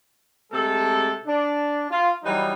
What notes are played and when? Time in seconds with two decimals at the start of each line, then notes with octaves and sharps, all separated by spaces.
0.52 C3 G#3 A3 A4
1.26 D4
1.91 F4
2.24 E3 F#3 G3 D#4